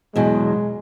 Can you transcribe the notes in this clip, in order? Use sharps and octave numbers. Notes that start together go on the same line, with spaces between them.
E2 B2 F#3 G#3